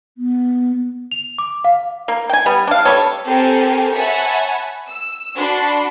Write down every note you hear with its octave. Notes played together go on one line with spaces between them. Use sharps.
B3
F7
D6
F5
A#3
G5 G#5
G3 B3
D4 F5
G3 B3 A4 C#5
C4 G4 A4 A#4 G#5
C#5 E5 F#5 G#5 A5 B5
E6
D4 F#4 B5 C6